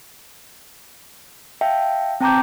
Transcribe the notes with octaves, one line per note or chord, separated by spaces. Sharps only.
E5 F5 G5 A5
C4 G5 A5 A#5 D6 G6